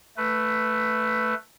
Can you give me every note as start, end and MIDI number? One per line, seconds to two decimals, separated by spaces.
0.17 1.34 57
0.17 1.34 71